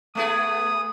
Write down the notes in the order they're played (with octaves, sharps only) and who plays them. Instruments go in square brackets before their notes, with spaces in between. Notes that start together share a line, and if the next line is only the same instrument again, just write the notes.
[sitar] A3 B3 G#4 [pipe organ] D#6